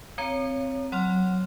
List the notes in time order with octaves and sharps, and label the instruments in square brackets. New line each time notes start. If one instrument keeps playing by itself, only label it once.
[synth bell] C4 A#5 [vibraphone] C#5
[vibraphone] F#3 [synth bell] C#5 C6 F6